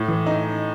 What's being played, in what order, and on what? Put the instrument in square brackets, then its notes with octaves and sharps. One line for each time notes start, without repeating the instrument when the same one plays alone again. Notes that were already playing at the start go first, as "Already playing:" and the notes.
Already playing: [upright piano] A2
E3
D#4